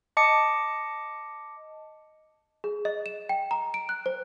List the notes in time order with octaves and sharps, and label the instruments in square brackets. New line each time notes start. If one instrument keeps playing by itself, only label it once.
[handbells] D#5 A5 D6 C#7
[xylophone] G#4
D#5
E7
G5
A#5
D7
F#6
C5